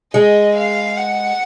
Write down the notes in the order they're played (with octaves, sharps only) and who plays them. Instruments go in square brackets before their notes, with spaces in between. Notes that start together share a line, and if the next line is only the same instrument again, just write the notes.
[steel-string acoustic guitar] G#3 [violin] D#5
[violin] F5
F#5